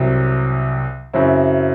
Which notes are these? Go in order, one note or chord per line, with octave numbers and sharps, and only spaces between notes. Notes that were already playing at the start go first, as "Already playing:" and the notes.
Already playing: C2 C3 F#3
F#2 C#3 F#3 C4 E4